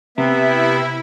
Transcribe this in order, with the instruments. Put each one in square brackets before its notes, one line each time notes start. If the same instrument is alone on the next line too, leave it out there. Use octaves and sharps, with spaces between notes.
[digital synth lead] C3 [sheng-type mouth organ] B3 E5 [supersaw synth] E4